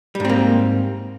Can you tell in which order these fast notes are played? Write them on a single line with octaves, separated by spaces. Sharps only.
G3 G#2 C4 A#3